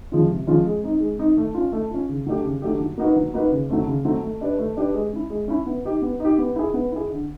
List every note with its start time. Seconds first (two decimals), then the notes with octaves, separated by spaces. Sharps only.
0.12 F3 G#3 C#4 F4
0.30 C3
0.47 F3 G#3 C#4 F4
0.65 G#3
0.83 C4 D#4
1.00 G#3
1.19 C4 D#4
1.37 A3
1.54 C#4 F4
1.72 A3
1.91 C#4 F4
2.09 C#3
2.26 F#3 A3 D4 G4
2.45 C#3
2.62 F#3 A3 D4 G4
2.80 F#3
2.98 A#3 D#4 F#4 B4
3.16 F#3
3.34 A#3 D#4 F#4 B4
3.51 C#3
3.69 F#3 A3 C4
3.87 C#3
4.05 F#3 A3 C4
4.23 A3
4.41 D4 G4 B4 D5
4.59 A3
4.77 D4 G4 B4 D5
4.94 G#3
5.13 C#4 E4
5.30 G#3
5.48 C#4 E4
5.66 B3
5.85 D#4 G4
6.02 B3
6.20 D#4 G4
6.38 B3
6.56 E4 G#4
6.74 B3
6.92 E4 G#4
7.10 D3